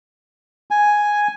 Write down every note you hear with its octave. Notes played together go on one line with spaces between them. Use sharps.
G#5